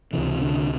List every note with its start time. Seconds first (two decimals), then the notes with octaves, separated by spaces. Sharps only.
0.13 C#2 C3 E3
0.42 D3